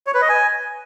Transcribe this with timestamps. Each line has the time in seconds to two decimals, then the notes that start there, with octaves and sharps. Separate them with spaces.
0.07 C#5
0.14 B4
0.22 D#5
0.29 G#5